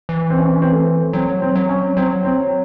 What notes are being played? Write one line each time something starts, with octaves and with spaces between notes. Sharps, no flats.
E3
C4
C#4
C4
C#4
C4
A3
F#3 C4
C4
F#3
C#4
F#3 C4
C4